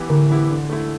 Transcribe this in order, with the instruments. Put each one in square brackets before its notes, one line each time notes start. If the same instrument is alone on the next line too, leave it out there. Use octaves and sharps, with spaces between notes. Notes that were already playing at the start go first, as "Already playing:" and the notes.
Already playing: [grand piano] E3 B3 E4 G4
[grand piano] A2 [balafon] D3
[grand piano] E3 B3 E4 G4
D3
A3 E4